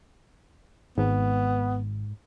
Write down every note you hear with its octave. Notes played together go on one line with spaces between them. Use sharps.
G#1 G#2 B3